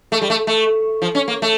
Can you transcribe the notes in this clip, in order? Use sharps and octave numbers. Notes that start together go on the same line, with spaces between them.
A3
G3
A3
A3
F3
C#4
A#3
A3